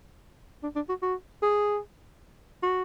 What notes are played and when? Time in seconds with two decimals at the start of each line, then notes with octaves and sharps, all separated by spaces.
0.63 D4
0.75 D4
0.89 F#4
1.02 F#4
1.42 G#4
2.63 F#4